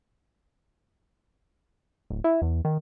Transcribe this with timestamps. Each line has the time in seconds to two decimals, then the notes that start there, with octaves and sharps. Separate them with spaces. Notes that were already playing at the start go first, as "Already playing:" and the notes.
2.10 D1
2.24 E4
2.42 E2
2.65 D#3